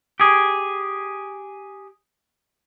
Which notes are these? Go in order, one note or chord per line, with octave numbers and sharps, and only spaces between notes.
G4 G#4